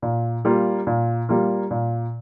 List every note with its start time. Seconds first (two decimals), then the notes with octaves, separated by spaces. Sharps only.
0.02 A#2
0.45 G3 A#3 F4
0.87 A#2
1.29 G3 A#3 F4
1.71 A#2